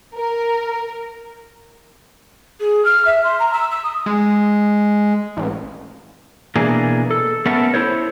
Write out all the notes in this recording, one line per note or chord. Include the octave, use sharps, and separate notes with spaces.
A#4
G#4
F6
E5
C6
A#5
E6
E6
D#6
G#3
A1
B2 E3 A#3 D4 G#4
A4
A3 B3 C#4 A4 A#4
E4 A4 C5 C#5